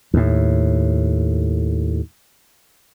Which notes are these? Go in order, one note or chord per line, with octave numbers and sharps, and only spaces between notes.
D#2 A2